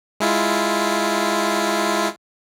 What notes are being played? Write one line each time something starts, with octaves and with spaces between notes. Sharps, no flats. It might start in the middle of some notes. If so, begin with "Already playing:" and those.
G#3 E4 F4